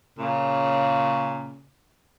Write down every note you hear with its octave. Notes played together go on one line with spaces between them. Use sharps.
A#2 C#3